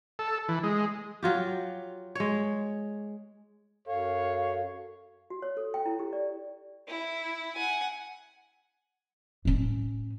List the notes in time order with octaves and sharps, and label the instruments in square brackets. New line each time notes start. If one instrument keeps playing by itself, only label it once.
[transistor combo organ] A4
E3
G#3
[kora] F#3 F4 G4
G#3 C#5
[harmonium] F#2 [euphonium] A4 [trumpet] C#5 [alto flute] F5
[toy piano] F#4
C#5
A4
G5
E4
G4
D5
[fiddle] E4
F#5 G#5
[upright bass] A2 C#4